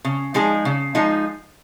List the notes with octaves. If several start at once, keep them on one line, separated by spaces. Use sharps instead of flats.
C#3
F3 G#3 D#4 G#4
C#3
F3 G#3 D#4